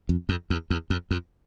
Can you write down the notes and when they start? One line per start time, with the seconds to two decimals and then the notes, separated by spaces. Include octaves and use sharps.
0.09 F2
0.29 F2
0.50 E2
0.70 E2
0.90 F2
1.11 F2